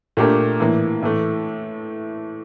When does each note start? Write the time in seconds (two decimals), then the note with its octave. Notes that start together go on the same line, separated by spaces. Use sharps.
0.17 A#2 A3 D4 G4 A#4
0.60 A2 E3 A#3
1.02 A2 E3 A3